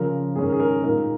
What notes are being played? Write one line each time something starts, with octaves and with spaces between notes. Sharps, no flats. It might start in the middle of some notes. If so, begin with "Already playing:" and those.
Already playing: C#3 F3 C#4 A#4
G#2 D#3 C#4 G#4
A#4
G#4
A#4
G#4
A#2 G#3 D#4 A#4